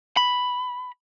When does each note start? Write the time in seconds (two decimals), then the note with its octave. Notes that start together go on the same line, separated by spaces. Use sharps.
0.17 B5